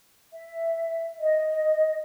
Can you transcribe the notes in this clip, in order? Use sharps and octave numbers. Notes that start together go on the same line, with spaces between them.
E5
D#5